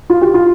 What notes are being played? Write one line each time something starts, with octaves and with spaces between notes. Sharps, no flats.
F4
G4
F4